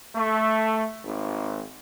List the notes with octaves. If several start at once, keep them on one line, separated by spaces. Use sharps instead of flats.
A3
G#1